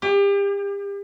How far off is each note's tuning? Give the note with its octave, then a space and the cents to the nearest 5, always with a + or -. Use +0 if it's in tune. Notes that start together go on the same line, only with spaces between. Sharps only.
G4 +35